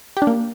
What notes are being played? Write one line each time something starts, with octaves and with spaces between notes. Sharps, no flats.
G4
D4
A#3